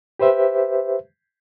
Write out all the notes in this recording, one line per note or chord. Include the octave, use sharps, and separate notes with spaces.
G4 B4 C5 E5